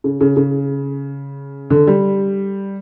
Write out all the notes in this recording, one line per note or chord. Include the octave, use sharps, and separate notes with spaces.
C#3
C#3
C#3
D3
G3